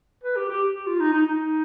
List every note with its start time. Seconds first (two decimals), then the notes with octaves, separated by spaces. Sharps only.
0.23 B4
0.36 G4
0.49 G4
0.74 G4
0.87 F4
1.00 D#4
1.13 D#4
1.26 D#4